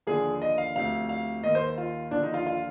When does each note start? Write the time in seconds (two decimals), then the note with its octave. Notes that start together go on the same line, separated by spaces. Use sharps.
0.07 D#2 D3 F3 G#4
0.42 D#5
0.58 F5
0.76 D2 C3 F3 F5
1.09 F5
1.43 D#2 D#3 D#5
1.55 C5
1.78 F4
2.11 D#2 D3 F3 D4
2.23 D#4
2.34 F4
2.47 F4